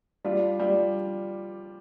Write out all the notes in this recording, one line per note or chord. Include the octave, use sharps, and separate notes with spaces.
G3 D4 F4
G3 D4 F4